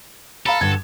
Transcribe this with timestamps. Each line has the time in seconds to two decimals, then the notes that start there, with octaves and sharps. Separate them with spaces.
0.46 A4 F5 A#5 B5
0.61 G2 D3 G#6